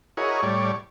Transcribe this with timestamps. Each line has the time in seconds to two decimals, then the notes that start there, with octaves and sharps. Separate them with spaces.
0.17 E4 F#4 G#4 A#4 C#5 D#5
0.43 A2 G3 C#5 D5